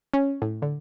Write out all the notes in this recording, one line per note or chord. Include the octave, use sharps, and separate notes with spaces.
C#4
A2
D3